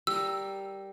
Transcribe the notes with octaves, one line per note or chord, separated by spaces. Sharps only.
G3 A#4 E6